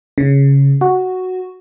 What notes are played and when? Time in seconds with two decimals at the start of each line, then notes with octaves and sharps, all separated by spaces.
0.18 C#3
0.81 F#4